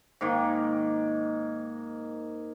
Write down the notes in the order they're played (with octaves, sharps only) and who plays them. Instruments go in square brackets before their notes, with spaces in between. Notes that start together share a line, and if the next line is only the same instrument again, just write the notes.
[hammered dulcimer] G#2 D#3 A#3